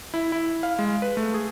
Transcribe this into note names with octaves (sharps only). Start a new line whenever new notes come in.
E4
E4
F5
G#3
B4
A3
G#4